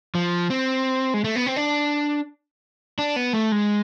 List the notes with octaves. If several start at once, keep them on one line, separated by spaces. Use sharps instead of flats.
F3
C4
G#3
A3
B3
C4
D4
D4
B3
A3
G#3